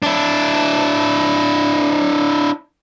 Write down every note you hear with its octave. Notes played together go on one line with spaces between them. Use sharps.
D4 E4